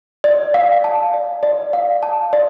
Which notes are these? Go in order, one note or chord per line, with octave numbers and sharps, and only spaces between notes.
D5
F5
A5
D5
D5
F5
A5
D5